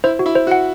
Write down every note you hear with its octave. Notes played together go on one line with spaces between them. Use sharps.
E4 C5
F#4
E4
C5
F#4
F#5